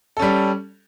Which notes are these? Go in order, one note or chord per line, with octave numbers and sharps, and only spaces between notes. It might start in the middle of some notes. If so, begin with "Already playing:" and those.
G3 C#4 A4